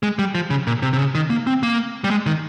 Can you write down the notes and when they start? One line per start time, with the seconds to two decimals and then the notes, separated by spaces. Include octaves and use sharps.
0.03 G#3
0.19 G3
0.35 F3
0.50 C#3
0.67 A#2
0.82 C3
0.93 C3
0.98 C#3
1.15 D#3
1.30 A#3
1.47 C4
1.63 A#3
2.04 G3
2.10 G#3
2.26 D#3